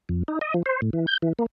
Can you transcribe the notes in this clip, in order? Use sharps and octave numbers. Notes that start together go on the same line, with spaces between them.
F2
D#4
D#5
F3
C5
A2
E3
G6
E3
A#3